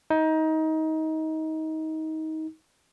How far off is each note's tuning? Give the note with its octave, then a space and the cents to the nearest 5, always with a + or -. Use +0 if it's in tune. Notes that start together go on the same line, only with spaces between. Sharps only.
D#4 +25